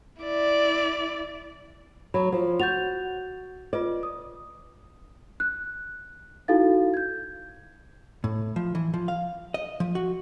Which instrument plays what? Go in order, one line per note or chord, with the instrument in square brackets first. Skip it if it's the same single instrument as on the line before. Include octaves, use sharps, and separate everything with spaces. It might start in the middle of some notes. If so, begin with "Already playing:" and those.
[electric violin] E4 D5
[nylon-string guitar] F#3 [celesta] B5
[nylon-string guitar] F3
[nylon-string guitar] F#4 [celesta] G6 A6 F7
[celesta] F4 B4 D#5 [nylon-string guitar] D5
[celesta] D#6
F#6
D#4 E4 F#4 A4 F5 A6
G6 G#6
[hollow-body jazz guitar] A2
F3
E3
F3
F5
D#5
F3
F#4